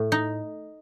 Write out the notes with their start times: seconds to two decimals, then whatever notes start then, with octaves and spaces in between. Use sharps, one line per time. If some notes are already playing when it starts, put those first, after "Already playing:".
Already playing: A2 A3
0.12 D#4